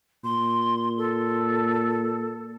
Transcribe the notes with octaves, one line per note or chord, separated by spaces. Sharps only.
A#2 C6
A4